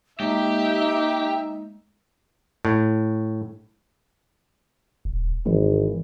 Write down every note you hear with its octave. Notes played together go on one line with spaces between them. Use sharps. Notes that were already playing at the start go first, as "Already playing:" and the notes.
G#3 A#3 D#4 G4 E5
A2
D#1
G#1 E3